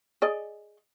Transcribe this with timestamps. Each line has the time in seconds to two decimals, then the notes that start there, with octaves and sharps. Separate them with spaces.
0.22 G#4 D5 D#5